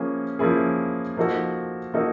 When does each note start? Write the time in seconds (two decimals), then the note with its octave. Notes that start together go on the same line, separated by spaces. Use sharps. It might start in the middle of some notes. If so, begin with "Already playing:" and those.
Already playing: F3 A#3 C#4 E4 G#4
0.39 F3 A#3 C#4 E4 G#4
1.17 F3 A#3 D#4 F#4 A4
1.94 F3 A#3 D#4 F#4 A4